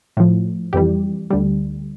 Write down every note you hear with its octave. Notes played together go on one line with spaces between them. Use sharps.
A2 F3
F2 E3 G3 G4
D2 D3 G3